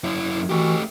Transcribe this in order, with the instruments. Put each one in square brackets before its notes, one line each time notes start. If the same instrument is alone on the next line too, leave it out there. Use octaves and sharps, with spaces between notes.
[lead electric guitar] F#2 E4
[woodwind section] E3 F#4 [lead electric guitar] A3 G4